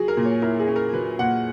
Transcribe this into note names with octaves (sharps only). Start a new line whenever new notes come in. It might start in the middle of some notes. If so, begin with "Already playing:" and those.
Already playing: F#3 G#4
A#4
A#2
C#5
E4 A#4
G#4
C#4
A#4
F#3 B4
A#2 F#5